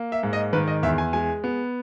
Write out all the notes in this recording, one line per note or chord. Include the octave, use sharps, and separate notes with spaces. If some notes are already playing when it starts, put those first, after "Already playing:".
Already playing: A#3
E5
G#2
D#5
D#3 B4
D#5
E2 E5
G#5
G#3 G#5
B3